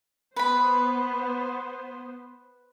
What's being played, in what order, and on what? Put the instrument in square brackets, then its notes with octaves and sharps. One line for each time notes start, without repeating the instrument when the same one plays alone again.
[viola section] B3 C5 [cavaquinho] B4 B5